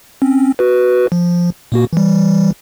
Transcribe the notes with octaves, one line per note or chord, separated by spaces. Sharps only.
C4 C#4
F#4 B4
F3
A#2 A#3 F#4
E3 G3